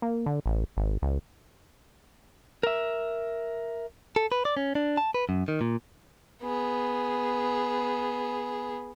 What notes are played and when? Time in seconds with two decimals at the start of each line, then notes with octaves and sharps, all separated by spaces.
0.02 A#3
0.26 D3
0.46 A1
0.77 G#1
1.02 C#2
2.63 A#4 E5
4.16 A4
4.32 B4
4.45 D5
4.57 C#4
4.75 D4
4.97 A5
5.14 B4
5.29 F#2
5.48 D#3
5.61 A#2
6.43 B3 G#4